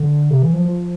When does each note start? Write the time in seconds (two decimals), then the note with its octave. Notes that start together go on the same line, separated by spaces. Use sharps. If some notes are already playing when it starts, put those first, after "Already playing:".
Already playing: D3
0.30 C3
0.42 E3
0.53 F3
0.65 F3